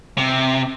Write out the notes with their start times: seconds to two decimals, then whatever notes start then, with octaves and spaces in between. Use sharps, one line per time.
0.18 C3